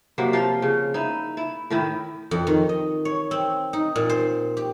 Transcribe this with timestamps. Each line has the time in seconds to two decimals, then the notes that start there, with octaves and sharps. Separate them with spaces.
0.18 C3 F#3 A#3
0.33 F3 F4 F5
0.62 C#3
0.94 D#4 E4
1.37 E4
1.70 A2 D#3 E4
2.31 F2
2.47 D#3
2.69 D#5
3.05 C#5
3.31 C4
3.73 D#4
3.96 A#2
4.09 C5
4.57 G4